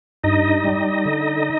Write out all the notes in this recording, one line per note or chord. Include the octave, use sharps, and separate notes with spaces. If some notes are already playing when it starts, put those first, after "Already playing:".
G2 D#4 D#5
G3
D3